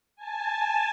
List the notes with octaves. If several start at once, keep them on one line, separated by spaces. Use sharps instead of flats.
G#5 A5